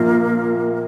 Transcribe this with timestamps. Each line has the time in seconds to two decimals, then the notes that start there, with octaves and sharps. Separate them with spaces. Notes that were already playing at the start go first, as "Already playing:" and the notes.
Already playing: A#1 A#2 F3 A#3